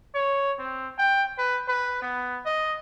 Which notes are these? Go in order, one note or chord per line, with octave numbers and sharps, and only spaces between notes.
C#5
C4
G5
B4
B4
B3
D#5